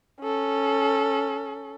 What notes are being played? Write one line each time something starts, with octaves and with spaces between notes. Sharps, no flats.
C#4 A4